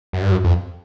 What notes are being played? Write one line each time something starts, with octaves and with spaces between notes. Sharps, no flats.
F#2
G2
F#2
F2